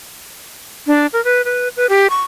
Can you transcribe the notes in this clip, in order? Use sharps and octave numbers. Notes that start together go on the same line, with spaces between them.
D4
A#4
B4
B4
B4
G4
C#6